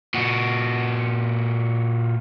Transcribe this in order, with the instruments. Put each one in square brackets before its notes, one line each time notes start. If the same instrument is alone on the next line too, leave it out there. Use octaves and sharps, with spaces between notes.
[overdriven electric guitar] A#2 F#4